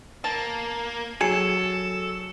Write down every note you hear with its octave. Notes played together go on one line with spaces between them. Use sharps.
A#3 A5
F#3 G#4 A4 C#7 E7